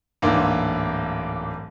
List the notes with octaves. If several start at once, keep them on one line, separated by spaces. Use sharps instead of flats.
D1 G#2 E3 A#3 D4 C6